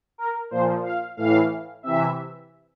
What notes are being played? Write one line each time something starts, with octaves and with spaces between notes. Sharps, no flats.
A#4
A#2 F3 C5
F5
A2 E3 F5
C3 E3 E5